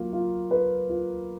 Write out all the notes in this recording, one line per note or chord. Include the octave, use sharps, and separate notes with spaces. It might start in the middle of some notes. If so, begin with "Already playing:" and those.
Already playing: F#3 A#3 F4
F4
B4
F4